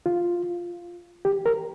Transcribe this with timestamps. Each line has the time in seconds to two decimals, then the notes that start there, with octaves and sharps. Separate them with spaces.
0.06 F4
1.25 G4
1.46 A#4